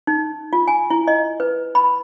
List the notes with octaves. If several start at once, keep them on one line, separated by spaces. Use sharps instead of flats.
D#4
F4
G#5
E4
D#5
B4
B5